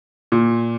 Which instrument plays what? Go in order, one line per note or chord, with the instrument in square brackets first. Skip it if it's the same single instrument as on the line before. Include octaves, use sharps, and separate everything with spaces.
[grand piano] A#2